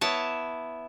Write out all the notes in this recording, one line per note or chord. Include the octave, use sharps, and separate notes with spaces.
B3 E4 C#5 A5